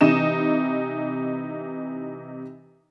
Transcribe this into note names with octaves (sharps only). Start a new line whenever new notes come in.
C3 E3 D#4 E7